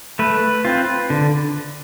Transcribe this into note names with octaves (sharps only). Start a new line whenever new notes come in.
A3 B4
C4 F4
D3